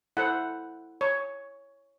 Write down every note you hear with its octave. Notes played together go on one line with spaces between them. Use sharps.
E4 A4 C5 F#5
C#5